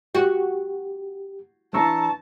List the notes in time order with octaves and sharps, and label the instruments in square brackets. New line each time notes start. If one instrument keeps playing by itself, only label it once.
[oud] F#4 [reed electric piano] G4
[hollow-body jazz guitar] E3 D4 [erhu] A5 [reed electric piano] A#5 C#6 E6